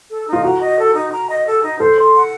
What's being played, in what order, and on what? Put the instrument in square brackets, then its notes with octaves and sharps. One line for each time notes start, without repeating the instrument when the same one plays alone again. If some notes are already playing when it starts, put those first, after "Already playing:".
[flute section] A4
D#4
[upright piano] F4
[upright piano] F#4 [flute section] A#5
[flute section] D#5
A4
D#4
A#5
D#5
A4
D#4
[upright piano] A4 [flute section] C5
[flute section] C6
F#5